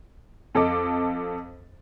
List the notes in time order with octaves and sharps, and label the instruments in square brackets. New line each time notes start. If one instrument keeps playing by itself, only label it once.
[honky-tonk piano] F2 A4 D#5 D6